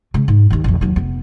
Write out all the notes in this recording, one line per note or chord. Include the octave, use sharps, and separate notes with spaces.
C#3 G#3
G#2
D#2 D#3
A#1 F2
D#2 F#3
F1 B3